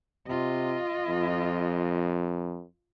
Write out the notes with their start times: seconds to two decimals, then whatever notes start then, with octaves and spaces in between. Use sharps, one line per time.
0.28 C3 F4 D#5
1.08 F2